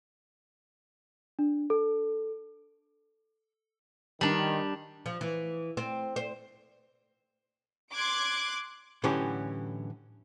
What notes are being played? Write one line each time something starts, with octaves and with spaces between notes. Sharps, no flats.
D4
A4
D#3 G3 D4
F3
E3
C4
C5
C6 D6 F#6 G#6 D7
A2 D3 E3 F#3 C#4 G4